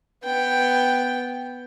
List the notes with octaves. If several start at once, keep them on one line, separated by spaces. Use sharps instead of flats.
B3 G5